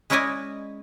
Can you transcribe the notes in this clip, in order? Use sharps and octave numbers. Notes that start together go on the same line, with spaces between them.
G#3 C#4 E4 D5 D#5 G#5